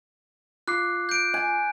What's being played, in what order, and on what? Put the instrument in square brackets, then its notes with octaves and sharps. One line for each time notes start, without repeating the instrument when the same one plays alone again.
[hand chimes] F4 D6 C7 [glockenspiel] F#6
[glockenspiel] G6 D7
[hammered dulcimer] G#5